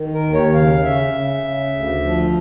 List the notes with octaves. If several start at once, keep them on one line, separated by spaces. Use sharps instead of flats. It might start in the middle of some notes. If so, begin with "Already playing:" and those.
Already playing: D#3
A#4
D#2
C#5
C#3 F5
C#3 E5
C#3
C#3
D2
F3